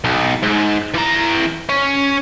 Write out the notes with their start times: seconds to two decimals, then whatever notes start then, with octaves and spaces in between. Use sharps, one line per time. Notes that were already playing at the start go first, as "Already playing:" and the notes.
0.04 B1
0.43 G#2
0.94 E3 A#5
1.69 C#4